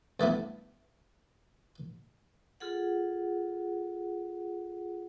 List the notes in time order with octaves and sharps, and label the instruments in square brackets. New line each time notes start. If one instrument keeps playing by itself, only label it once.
[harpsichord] G2 A3 B3 E4
[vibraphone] F4 G#4 A4 F#5